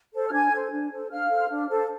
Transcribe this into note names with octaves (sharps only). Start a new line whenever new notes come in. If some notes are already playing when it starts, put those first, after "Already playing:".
A4 C5
F6
D4 G#5 G#6
A4 C5
D4
A4 C5
D4 F5 F6
A4 C5
D4
A4 C5